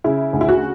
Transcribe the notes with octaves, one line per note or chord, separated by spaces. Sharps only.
C#3 E4
D2
E4
F#4